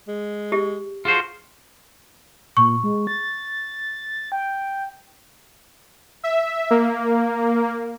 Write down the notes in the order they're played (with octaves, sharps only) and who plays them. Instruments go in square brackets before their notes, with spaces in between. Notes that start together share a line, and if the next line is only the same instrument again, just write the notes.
[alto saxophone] G#3
[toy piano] G4
[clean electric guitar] F4 F#4 C5 [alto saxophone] G#4
[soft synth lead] A#2 [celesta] C#6
[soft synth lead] G#3
A6
G5
[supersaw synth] E5
A#3